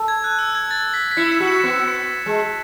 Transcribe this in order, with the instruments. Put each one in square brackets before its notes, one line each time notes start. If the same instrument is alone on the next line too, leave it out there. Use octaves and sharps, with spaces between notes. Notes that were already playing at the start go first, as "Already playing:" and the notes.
Already playing: [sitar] A4
[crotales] G#6
F#6
E6
G#6
A6
B6
B6
[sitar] E4 [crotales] C#7
[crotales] E7
[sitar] F#4
[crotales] E7
[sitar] B3
G#3